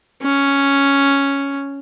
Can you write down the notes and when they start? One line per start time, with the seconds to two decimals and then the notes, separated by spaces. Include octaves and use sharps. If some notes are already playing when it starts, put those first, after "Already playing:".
0.23 C#4